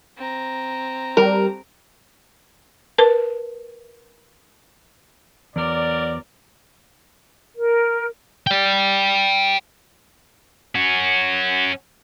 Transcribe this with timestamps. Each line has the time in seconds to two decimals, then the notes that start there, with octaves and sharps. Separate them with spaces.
0.17 C4 A#5
1.17 G3 A#4
2.98 A#4 B4 A5
5.56 E2 F#3 A#4 D5
7.55 A#4
8.47 D5 G5
10.75 C#4 F#4